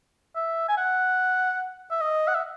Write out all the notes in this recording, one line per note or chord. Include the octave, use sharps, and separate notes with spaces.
E5
G#5
F#5
E5
D#5
F#5
E5